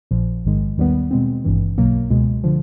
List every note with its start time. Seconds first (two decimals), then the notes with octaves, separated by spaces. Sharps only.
0.11 A#1 A#2 F3
0.44 A1 G#2 D#3 G#3
0.78 D#2 D#3 G3 B3
1.11 B2 G#3 C4
1.45 G#1 G2 E3
1.78 B1 B2 F#3 A#3
2.10 C#2 B2 G#3
2.44 D3 F3